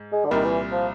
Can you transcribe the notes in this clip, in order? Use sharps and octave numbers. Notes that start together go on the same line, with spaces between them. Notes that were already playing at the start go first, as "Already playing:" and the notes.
Already playing: G#2
G#3
D3
C2 A#2 D#3 G3
E3
F3